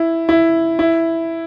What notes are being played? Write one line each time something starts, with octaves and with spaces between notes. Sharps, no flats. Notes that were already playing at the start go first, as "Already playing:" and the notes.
Already playing: E4
E4
E4